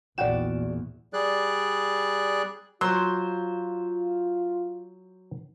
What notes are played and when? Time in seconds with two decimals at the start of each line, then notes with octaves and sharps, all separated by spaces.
0.18 A#1 E2 F#4 D5 F#5 G5 E7
1.13 G3 G#4 D5 F#6
2.81 F#3 F4 C5